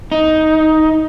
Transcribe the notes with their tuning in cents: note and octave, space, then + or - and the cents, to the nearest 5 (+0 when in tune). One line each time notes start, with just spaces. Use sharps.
D#4 +10